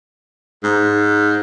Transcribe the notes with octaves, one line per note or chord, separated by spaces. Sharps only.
G#2